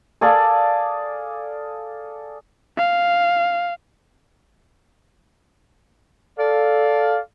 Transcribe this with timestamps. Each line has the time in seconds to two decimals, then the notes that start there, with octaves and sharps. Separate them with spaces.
0.21 G#4 A4 D5 F5
2.78 F5
6.39 A4 D5 F5